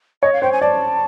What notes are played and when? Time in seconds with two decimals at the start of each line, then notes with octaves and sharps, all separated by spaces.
0.22 C#5 D#5
0.33 F5
0.42 C5 G5
0.52 G#5
0.61 D5 A5